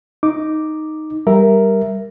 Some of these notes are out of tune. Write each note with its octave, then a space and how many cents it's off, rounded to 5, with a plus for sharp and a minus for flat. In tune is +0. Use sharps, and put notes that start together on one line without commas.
D#4 +0 D6 +0
G3 +0 A#4 +0 E5 +0